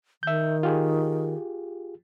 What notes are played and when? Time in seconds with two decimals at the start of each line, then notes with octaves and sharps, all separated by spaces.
0.23 D#3 E5 G6
0.63 F4 G4 G#4